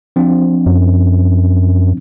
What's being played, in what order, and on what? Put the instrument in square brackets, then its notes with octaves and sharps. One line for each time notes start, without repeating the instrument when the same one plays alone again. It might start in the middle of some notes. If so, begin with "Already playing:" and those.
[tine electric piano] F3 C4 D4
[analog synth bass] F#2